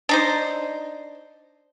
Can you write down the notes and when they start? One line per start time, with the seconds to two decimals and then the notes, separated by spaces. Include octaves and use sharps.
0.09 D4 D#4 C5